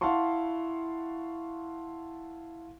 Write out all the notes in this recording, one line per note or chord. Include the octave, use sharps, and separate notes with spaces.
E4 F5 F#5 A5 C6 C#6